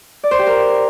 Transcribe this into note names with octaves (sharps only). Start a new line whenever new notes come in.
D5
C5
G4
A#4